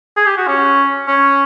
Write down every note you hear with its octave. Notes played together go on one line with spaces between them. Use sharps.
G#4
G4
F#4
C#4
C#4